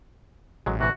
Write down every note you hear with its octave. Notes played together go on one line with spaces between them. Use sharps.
A1 F#3 G#3
C3 E3 F#4